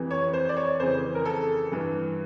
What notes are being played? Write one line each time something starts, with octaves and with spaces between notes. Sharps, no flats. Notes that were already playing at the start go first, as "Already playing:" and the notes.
Already playing: F2 C3 E3
C#5
C5
D5
C#5
F2 C#3 E3 C5
A#4
A4
G2 E3